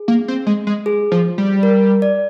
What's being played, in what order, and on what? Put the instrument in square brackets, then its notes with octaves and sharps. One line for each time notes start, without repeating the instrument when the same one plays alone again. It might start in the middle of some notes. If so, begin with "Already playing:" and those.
Already playing: [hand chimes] G#4
[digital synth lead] A#3
C4
G#3
G#3
[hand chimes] G#4
[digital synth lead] F3
G3
[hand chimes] A#4
D5